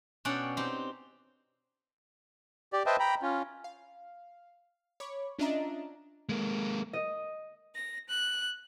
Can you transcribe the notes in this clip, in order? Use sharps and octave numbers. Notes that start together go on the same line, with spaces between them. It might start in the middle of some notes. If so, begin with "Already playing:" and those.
B2 C#4 D4 D5 F#5 G5
C4 D#4 G4
G4 D5
B4 C5 D#5 E5 G5 A5
G5 A#5 B5
C#4 F4
F5
C#5 B5 C#6 D6
C#4 D4 F4 D#5 E5 A#5
G#3 A#3
D#5
A#6
F#6